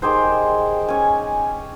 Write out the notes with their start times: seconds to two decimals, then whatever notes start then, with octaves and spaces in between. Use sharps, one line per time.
0.02 D#3 G4 G#4 C5
0.88 C#4 G#5